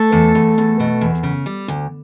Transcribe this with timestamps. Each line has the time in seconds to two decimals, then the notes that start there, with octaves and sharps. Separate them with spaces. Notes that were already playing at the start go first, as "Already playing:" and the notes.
Already playing: A3 A4
0.12 E2
0.35 E2
0.58 E2
0.80 B2
1.01 E2
1.23 C#3
1.46 G3
1.68 D2